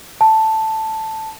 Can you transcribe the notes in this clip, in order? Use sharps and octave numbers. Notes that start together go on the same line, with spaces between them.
A5